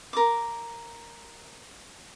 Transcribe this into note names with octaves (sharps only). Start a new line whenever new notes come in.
A#4 D6